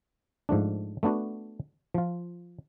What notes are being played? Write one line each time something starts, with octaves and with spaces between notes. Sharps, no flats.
G#2 F3 A3 D4
A3 B3 D4 F#4
F3 F4